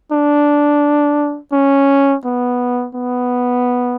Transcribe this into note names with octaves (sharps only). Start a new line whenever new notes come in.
D4
C#4
B3
B3